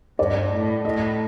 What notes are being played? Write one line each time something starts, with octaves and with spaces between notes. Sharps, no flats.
G2 D5
A2
A2 D#5